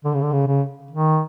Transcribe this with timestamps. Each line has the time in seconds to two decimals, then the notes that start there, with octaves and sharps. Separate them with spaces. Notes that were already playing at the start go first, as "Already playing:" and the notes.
0.05 D3
0.14 C#3
0.23 D3
0.33 C#3
0.47 C#3
0.91 D#3